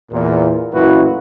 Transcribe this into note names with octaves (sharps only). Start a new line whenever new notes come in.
E2 A#2
A1 F#2 A#2 E4 F#4 B4